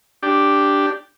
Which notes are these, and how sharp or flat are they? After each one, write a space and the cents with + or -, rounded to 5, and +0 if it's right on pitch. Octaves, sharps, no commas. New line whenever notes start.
D4 +0 G4 +0